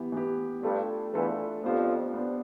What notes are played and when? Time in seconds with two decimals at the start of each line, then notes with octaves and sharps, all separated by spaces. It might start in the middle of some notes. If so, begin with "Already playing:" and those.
Already playing: E3 B3 E4 G4
0.12 E3 B3 E4 G4
0.62 G2 G3 A3 D4 F4 A4
1.13 E2 E3 A3 D4 F4 A4
1.63 F2 F3 B3 D4 G4 C5
2.14 B3 D4 G4 C5